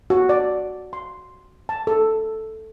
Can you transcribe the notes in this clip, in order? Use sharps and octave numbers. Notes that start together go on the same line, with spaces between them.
F#4
D5
C6
A5
A4